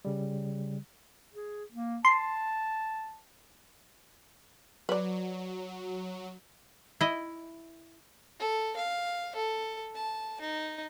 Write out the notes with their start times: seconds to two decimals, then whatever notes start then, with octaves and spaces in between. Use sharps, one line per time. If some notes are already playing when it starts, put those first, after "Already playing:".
0.05 C#3 G3
1.34 G#4
1.72 A#3
2.05 A5 C6
4.89 F#3 B4 D5
7.01 E4 D#5
8.39 A4
8.76 F5
9.35 A4
9.95 A5
10.41 D#4